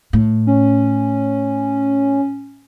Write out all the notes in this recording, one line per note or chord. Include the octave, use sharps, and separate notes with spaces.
A2
C#4